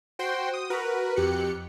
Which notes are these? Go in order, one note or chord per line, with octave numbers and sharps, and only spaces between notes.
F#4 C5 G5 C6
D#6
F#4 A#4 B4
F2 G4 F#6 C#7